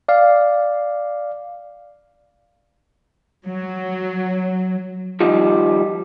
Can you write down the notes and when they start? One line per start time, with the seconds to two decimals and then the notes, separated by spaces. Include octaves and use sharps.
0.08 D5 F5
3.45 F#3
5.20 D#3 F3 G3